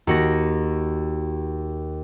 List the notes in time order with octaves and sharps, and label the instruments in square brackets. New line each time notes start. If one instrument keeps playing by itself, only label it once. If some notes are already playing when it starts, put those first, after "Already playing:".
[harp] D#2 F#4 A#6